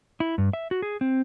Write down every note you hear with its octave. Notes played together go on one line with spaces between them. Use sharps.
E4
G2
E5
F#4
G#4
C4